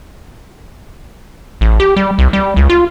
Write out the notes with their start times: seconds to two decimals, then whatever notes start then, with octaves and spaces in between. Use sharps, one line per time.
1.61 A1
1.80 G4
1.96 G3
2.19 C2
2.33 G3
2.56 C#2
2.69 F4